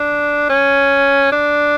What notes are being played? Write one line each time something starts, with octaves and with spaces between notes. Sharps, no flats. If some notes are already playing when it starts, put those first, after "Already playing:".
Already playing: D4
C#4
D4